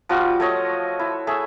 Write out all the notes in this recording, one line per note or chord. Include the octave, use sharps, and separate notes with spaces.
F3 G3 F4 F#4
A3 C#5 D#5
E4
A3 G#4 E5